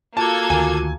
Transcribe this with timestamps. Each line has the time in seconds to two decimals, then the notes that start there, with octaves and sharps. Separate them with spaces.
0.17 A#3 F4 F#4 A4 A5 D6 G#6
0.50 D2 D#3 G#5